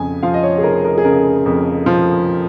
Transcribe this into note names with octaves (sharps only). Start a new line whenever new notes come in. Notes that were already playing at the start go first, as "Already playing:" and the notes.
Already playing: F2 C#3 G#5
F3 F5
D#5
C#5
G#4
F1 A#4
A#4
G#4
C#3 A#4
F2
F3